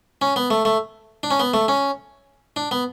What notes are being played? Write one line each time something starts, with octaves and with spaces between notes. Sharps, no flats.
C#4
B3
A3
A3
D4
C#4
B3
A3
C#4
D4
B3